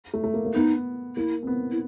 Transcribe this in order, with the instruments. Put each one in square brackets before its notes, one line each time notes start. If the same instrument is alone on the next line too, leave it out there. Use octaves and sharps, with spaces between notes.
[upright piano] A3
A3
A#3
A#3
[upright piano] B3 [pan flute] D#4
[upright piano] A#3 [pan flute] E4
[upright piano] C4
B3
[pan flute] E4